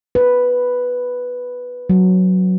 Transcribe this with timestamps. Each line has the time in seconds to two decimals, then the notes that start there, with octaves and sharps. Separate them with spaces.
0.15 B4
1.90 F#3